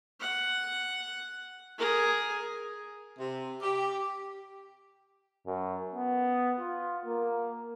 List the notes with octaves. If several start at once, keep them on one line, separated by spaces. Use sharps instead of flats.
F#5
G#4 A#4
C3
G4
F#2
B3
F4
A#3